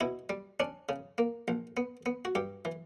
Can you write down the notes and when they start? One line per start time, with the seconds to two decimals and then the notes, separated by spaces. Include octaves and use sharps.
0.01 B2 E4
0.30 G3
0.60 C#4 D4
0.89 C#3
1.18 A#3
1.48 A#1
1.77 B3
2.06 B3
2.25 F#4
2.35 G2 G4
2.65 E3